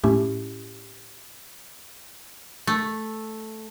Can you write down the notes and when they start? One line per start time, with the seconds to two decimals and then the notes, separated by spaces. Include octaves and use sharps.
0.04 A2 A3 C#4 E4 G4
2.67 A3